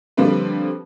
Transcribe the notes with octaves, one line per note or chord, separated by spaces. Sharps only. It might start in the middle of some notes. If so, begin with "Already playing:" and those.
D3 F3 G3 A#3 C4 B4